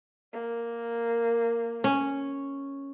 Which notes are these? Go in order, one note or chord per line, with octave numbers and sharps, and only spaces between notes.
A#3
C#4